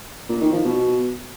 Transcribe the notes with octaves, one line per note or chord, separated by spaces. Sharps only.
A#2
D#3
F3
B2